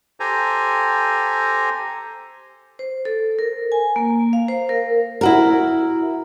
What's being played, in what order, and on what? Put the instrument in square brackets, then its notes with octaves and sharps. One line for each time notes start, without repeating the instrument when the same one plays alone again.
[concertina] G4 A4 C5 G#5 A#5
[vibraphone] C5
A4
A#4
G#5
A#3
F5
C5
A#4
[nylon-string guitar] E4 F#4 A#4